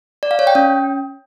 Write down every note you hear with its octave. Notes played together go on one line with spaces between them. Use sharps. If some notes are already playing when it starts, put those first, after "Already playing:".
D5
F5
C#5
G5
C#4